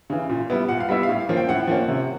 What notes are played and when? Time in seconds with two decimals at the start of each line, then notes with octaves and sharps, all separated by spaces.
0.10 C#3 E3
0.29 A#2
0.50 G3 B3 E4
0.69 A#2 F#5
0.80 F5
0.89 G3 B3 E4 E5
1.03 F5
1.09 A2
1.29 F3 A#3 C#4
1.37 G5
1.49 A2 F#5
1.67 F3 A#3 C#4
1.88 C3